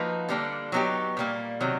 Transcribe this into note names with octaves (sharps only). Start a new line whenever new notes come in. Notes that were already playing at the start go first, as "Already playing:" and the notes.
Already playing: F3 A#3 D#4 F#4 B4
D3 G3 A#3 D4
F#3 B3 D#4 G4
A#2 G3 A#3
C3 D#3 F#3